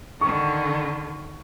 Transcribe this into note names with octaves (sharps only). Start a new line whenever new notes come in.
D3 D#3 C#6